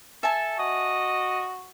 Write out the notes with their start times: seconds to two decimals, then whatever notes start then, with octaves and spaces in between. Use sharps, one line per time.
0.23 A4 E5 G#5 A5
0.59 F#4 D#5